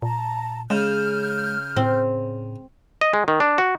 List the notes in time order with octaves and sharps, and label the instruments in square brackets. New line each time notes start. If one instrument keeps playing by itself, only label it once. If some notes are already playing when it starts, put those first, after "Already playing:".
[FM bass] A#2 [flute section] A5 A#5
[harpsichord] C#3 [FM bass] G#3 [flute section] F6 G6
[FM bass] A2 [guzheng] C4
[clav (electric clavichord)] D#5
G#3
D#3
D4
F#4